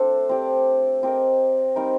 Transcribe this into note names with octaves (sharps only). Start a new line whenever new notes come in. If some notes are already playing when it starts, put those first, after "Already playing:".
Already playing: A3 C4 D4 A4 C5
C4 G4 D5
C4 G4 A#4 D#5
G3 C4 D#4 A#4